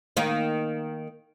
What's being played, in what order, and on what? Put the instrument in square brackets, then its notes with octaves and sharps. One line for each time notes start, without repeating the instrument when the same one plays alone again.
[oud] D#3 A#3